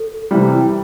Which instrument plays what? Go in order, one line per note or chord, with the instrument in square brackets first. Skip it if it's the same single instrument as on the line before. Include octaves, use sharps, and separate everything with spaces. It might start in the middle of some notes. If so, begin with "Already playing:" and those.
Already playing: [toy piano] A4
[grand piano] C3 E3 G3